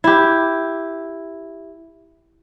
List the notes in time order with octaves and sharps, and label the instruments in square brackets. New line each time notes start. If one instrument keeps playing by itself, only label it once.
[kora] E4 G4